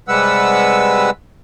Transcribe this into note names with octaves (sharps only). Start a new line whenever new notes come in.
C3 G3 G#3 B4 F#5 E6